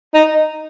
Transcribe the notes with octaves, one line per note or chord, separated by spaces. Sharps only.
D#4